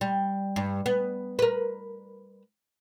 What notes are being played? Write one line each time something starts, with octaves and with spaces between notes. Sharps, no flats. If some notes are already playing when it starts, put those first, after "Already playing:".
G3
G2
B3
A#4 B4